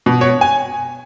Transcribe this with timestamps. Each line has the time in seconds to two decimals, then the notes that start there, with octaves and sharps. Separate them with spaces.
0.06 B2
0.21 C#5
0.41 G#5